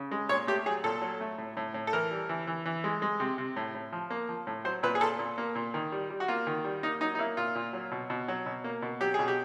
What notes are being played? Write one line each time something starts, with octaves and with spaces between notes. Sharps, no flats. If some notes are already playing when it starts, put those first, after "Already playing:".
Already playing: C#3
G#3
A#2 C#5
A3 G4
F#3 G#4
A#2 A4
F#3
A3
A2
A2
A2
A4
E3 A#4
G3
E3
E3
E3
G#3
G#3
C3
C3
A2
A2
F3
A#3
F3
A2
F#3 C5
A#2 B4
G#4
A#2 A4
A#2
A#3
A#2
D#3
G3
G3
F#4
A#3 F4
D#3
G3
A#3 D#4
F#3 D#4
D#4
A#3 E4
A#2 F4
A#2
F#3
B2
B2
F#3
B2
A#3
B2
F#3 G4
B2 G#4
G4